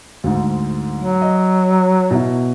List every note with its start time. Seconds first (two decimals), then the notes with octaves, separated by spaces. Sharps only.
0.24 D2 G#2
0.97 F#3
1.22 D#5
2.11 B2 E4